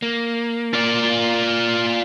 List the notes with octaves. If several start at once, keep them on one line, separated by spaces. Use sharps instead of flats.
A#3
F4 D5